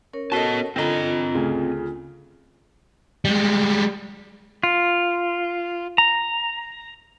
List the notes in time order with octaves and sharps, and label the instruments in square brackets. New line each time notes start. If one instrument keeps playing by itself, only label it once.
[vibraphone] C#4 A#4 C#5
[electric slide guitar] B3 A5 [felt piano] F#4 A4 D#5
[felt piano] D3 A#5 [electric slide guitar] C4 D#5 [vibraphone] F4
[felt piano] D2 C#3
[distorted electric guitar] G3 G#3
[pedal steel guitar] F4
A#5